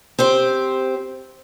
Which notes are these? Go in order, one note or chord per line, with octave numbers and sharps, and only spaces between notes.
C4 G4 C5